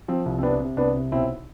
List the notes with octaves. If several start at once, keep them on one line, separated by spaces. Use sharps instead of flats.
F3 C4
C2
C4
C3 B3 D4
C3
C2 B3 D4
C3
B1 C4 E4